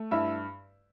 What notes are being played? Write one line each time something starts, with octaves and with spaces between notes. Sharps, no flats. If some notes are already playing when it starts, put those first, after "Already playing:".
Already playing: A3
G2 E4 E5